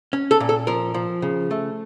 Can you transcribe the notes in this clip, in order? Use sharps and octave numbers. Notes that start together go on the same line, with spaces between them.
C#4
A4
A#2
A4
F3 A#4
F3
C#3
A3